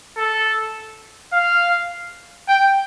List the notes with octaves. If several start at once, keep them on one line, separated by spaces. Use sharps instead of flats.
A4
F5
G5